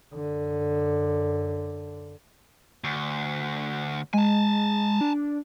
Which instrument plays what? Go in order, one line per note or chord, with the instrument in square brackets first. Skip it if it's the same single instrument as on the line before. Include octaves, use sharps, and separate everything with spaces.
[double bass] F#2 D3
[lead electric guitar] D2
[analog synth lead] G#3 [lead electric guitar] G#5 A5
[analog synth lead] D4